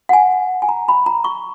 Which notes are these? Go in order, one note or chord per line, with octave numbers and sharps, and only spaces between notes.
F#5
G#5
G#5
A#5
B5
A#5
C#6